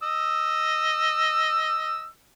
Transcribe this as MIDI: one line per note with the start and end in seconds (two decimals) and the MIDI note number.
0.03 2.05 75
0.03 2.05 88